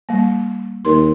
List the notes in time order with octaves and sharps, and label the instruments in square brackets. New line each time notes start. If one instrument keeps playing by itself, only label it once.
[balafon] G3 A#3
[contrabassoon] D#2 [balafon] A#4 C6